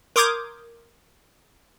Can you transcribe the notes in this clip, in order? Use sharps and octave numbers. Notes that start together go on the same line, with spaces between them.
A#4 C6 D6 D#6 G6 G#6